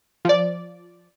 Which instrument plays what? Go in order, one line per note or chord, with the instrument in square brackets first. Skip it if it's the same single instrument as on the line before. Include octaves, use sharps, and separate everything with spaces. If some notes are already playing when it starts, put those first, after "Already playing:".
[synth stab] F3 D5